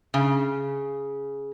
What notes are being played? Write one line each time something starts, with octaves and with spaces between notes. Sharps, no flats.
C#3